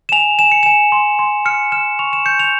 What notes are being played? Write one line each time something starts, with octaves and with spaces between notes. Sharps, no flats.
E7
G#5 F7
G#5 E7
C#7
G#5 E7
C6
C6
F6 C#7
F6 E7
C#6 F7
E7
G6 C#7
F7